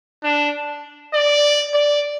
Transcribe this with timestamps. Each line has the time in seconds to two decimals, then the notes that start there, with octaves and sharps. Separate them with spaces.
0.24 D4
1.14 D5
1.74 D5